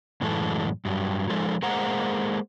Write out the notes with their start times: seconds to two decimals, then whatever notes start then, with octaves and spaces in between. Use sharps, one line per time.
0.21 F#2 A2 E3 G#3 A4
0.85 G2 F#3
1.30 F3 G#3 D#4 A4
1.62 G#3 A#3 C5 F#5 A#5